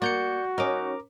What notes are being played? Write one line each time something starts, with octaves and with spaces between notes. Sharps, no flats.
A#3 F#4 D5 G6 C#7
C#4 D#4 A#4 A#5 D6